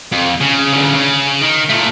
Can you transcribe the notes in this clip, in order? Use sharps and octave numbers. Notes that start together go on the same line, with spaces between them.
F2
C#3
D2 C#3
C#3
D#3
A#2 A3